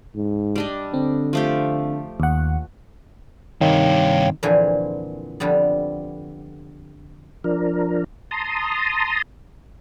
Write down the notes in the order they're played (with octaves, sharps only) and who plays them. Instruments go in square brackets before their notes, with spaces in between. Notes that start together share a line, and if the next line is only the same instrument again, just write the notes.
[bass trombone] G#2
[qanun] G3 D4 D#5
[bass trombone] D3 [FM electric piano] C4
[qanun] F3 A3 G4
[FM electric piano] D#2 F#5
[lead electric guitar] G2 C3 [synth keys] D#3 [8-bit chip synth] C#5 F5 G5
[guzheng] F2 A#2 D3 E3 C5 G#5
F2 D3 G3 B3
[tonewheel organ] F3 D4 A#4
A5 A#5 C6 D#6